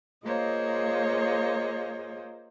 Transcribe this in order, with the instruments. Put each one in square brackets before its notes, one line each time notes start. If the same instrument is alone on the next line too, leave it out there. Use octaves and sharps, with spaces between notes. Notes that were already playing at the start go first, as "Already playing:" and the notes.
[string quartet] A#3 F4 G#4 C5 C#5 D#5